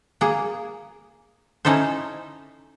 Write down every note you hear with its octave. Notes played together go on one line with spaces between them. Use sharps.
A#3 G#4
C#4 D#4 E4 A4 C5